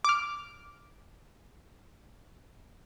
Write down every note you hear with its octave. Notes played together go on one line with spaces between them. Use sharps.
D6 F6